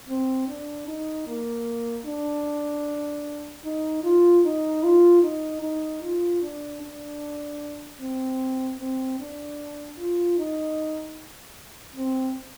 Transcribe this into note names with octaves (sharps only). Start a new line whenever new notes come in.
C4
D4
D#4
A#3
D4
D#4
F4
D#4
F4
D#4
D#4
F4
D4
D4
C4
C4
D4
F4
D#4
C4